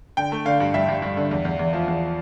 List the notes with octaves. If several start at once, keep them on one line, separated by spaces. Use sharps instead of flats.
D3 G5
A3
D3 F5
G2
G2 E5
G2
G2
D3
E2
E2
E2
F3
E2